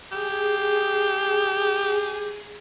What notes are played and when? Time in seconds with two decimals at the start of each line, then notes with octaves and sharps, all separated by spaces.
0.12 G4 G#4